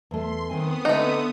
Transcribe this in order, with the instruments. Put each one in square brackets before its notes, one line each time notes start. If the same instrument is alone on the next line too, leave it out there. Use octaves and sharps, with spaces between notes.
[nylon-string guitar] E2 A3 [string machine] C6
[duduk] D#3 [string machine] B3 D#6 [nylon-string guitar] C4 G#5
[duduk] D3 [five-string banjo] A3 D#4